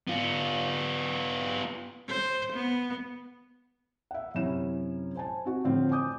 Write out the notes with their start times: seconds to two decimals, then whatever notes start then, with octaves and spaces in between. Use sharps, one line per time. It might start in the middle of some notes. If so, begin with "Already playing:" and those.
0.07 B3 F4
2.09 C5
2.54 B3
4.11 E5 F#5
4.35 F#2 C3 C#4 E4 E7
5.15 C5 G#5 A5
5.45 C4 F#4
5.64 A2 D3 F3 C4 F4
5.91 G#5 D6 D#6 G6